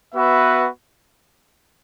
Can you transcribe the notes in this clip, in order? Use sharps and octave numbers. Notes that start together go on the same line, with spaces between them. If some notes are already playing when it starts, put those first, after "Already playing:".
B3 F#4 B4 E5